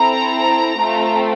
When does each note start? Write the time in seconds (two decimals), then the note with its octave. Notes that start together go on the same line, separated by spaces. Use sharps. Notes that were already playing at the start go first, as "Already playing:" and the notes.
Already playing: C4 E4 A4 A#5
0.78 A3 C4 F4